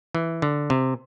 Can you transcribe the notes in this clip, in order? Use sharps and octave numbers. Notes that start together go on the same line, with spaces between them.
E3
D3
C3